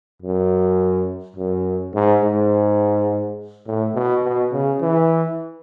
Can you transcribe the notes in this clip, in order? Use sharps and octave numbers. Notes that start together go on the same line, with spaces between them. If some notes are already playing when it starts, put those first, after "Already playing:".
F#2
F#2
G#2
G#2
A2
B2
B2
C#3
E3